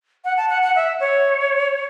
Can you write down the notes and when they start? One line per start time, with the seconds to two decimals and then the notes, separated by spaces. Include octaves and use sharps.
0.24 F#5
0.37 A5
0.49 F#5
0.63 F#5
0.76 E5
1.00 C#5